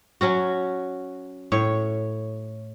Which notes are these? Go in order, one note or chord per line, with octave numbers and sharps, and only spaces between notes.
F#3 C#4 F#4
A2 C#5